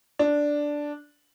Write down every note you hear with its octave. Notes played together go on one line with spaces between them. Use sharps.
D4